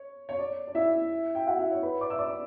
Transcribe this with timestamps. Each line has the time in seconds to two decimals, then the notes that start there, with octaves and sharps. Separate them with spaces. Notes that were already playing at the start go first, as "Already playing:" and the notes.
Already playing: C#5
0.29 C#5
0.39 D5
0.67 D5
0.75 E4 E5
1.35 G5
1.47 F#4 F#5
1.59 E4 E5
1.71 C#5
1.83 B4 B5
2.01 D5 D6
2.10 E5 E6
2.19 D5 D6